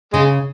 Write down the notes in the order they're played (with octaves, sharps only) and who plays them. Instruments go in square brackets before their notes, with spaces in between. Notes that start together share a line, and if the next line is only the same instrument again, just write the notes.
[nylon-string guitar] C#3 [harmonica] G#3